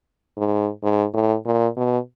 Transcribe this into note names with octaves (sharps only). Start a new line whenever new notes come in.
G#2
G#2
A2
A#2
B2